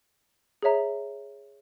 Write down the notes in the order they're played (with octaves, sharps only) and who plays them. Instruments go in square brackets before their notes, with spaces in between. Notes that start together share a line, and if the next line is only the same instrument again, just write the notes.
[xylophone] G#4 C#5 E5 A#5